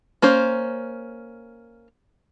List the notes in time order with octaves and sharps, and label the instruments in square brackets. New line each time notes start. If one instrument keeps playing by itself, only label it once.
[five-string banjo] A#3 C#4 C5